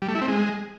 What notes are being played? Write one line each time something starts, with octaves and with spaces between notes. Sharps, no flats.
G3
A3
E4
C4
G#3